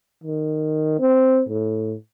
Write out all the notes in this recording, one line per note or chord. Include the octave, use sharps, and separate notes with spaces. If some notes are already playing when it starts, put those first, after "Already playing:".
D#3
C4
A2